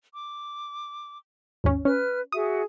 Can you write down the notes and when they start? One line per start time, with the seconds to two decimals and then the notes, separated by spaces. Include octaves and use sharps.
0.13 D6
1.64 G#1 D#2 C#4
1.85 C#4 B4 F6
2.32 F#4 G#4 E5 D#6